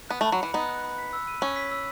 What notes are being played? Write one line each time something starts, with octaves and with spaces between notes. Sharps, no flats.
B3 F#6
A3
B5
F#3
E3 C#7
B3 D#4 B5
F#6
B5
B6
E6
D#7
C#4 F#7
B6
E6